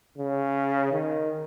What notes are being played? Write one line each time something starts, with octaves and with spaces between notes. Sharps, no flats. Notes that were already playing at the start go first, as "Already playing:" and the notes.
C#3
D#3